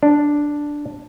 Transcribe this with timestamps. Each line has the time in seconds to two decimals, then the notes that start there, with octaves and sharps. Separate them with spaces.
0.03 D4